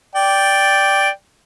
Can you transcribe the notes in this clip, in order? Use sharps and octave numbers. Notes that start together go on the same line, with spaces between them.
D5 G5